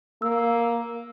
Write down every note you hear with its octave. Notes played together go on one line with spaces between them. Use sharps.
A#3 E6